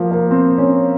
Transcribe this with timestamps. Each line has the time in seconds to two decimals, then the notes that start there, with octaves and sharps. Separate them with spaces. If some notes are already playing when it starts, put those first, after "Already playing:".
Already playing: F3 A#3
0.11 A#3
0.31 C4
0.58 C#4